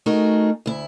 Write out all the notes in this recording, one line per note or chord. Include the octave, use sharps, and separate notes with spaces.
A3 D#4 F#4 G#4 A#4
D2 E4